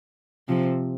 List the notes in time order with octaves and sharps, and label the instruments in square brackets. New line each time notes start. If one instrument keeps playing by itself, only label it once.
[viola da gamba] C3 F3